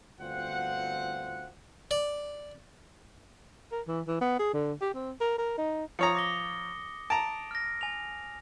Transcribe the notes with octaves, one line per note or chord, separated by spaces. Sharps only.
G1 D2 C4 F4 F#5
D5
A#4
E3
E3
B3
G#4
D3
G4
C4
A#4
A#4
D#4
F3 C#5 A#5 D#6 C#7
D6 A#6 G7
A5 A#5 D7
F6 A#6
G#5 F7